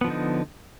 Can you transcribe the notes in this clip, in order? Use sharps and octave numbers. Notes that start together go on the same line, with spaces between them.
D3 F3 B3 D#4